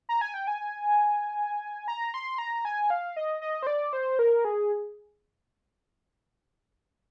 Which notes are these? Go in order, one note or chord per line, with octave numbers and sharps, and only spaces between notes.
A#5
G#5
G5
G#5
A#5
C6
A#5
G#5
F5
D#5
D#5
C5
D5
C5
A#4
G#4